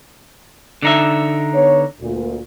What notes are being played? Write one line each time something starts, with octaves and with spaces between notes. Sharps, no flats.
D3 D#4 E5
B3 C#5
D2 A#2